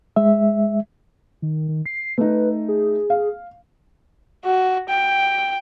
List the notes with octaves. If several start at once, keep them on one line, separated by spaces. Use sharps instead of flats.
G#3 E5
D#3
D#3
C7
A3 D#4 B4
G#4
F5
F#4
G5